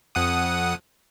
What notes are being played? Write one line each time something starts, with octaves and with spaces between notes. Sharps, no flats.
F2 F#5 D#6